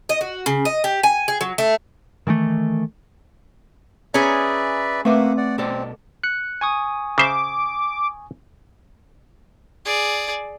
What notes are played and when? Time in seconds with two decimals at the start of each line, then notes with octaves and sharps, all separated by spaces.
0.09 D#5
0.21 F#4
0.46 C#3
0.65 D#5
0.84 G4
1.03 G#5
1.28 G#4
1.41 F#3
1.58 A3
2.27 D#3 E3 G3 A3
4.14 C#4 G#4 B4 D5 E5 A#5
5.05 A3 A#3 C4 B4 E5 F#5 D6
5.37 D5 F#5
5.58 B2 C4 A4 D5
6.23 F#6 C#7
6.61 G#5 C#6 D#6
7.18 C#3 C5 E5 D6
9.86 G#4 D5